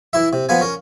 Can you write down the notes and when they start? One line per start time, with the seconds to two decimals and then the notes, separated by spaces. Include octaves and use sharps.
0.13 E3 E4 E5
0.33 C3
0.49 F3 B3 B4 F5 G#5
0.61 C#4 A#4